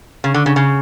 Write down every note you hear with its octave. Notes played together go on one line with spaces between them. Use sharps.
C#3
D3
C#3
C#3